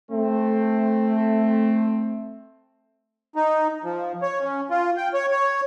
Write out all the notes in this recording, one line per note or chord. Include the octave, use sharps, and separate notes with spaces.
A3 C4
D#4
F3
C#5
C#4
F4
G5
C#5
C#5